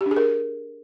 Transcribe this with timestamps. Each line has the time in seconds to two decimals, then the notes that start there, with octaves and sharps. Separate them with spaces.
0.01 G4
0.06 D4
0.11 G#4
0.16 A#4